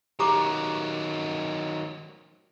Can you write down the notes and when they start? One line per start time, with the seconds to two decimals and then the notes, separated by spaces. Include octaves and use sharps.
0.19 D#3 F#3 G4 A#5 D6